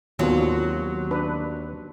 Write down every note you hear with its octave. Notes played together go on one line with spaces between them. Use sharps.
D#2 F#3 B3 C4 F4
D4 B4